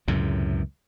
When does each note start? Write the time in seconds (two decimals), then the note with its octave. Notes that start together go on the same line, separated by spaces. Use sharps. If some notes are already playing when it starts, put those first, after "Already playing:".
0.08 C#2 F#2 A2 C3